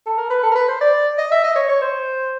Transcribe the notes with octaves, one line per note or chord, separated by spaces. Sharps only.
A4
A#4
B4
A4
A#4
B4
C5
D5
D#5
E5
D#5
C#5
C#5
C5